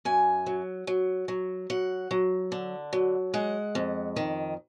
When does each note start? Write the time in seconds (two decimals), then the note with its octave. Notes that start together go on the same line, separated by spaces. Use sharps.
0.05 F#2 G#5
0.46 F#3
0.87 F#3
1.28 F#3
1.70 F#3 F#5
2.11 F#3
2.52 D3
2.93 F#3
3.34 G#3 F#5
3.75 F2
4.16 D#3